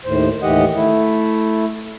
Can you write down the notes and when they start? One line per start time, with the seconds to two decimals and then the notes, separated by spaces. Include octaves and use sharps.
0.05 D#2 A2 C5
0.42 D#2 A2 E3 G4 D#5 F#5
0.75 A3 E4